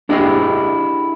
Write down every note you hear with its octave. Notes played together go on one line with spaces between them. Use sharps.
D4 E4 G4 G#4 D#5